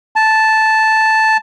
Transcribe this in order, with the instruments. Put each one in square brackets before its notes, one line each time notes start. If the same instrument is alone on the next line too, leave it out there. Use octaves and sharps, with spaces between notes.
[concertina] A5